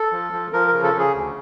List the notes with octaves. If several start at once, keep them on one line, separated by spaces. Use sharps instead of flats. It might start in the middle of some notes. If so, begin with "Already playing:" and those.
Already playing: A4
F3
F3
F3 A#4
A#4
C#3
A4
C#3
G#4
D2